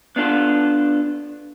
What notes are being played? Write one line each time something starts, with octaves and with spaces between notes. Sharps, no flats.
B3 D4 F4 A4